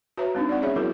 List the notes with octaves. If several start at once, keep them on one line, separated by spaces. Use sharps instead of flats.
F#4 B4 C#5 E5 A#5
G#3 C4 D4 D#4
D5 F#5
B3 C#4 G#4 C#5 E5
F3 F#3 B3 E4 F#4 A#4